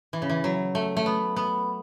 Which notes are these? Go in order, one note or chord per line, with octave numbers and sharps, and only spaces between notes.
E3
C#3
E3
F#3
A3
A3
B3
B3